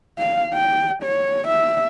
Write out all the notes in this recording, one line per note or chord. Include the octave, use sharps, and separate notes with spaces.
F5
G5
C#5
E5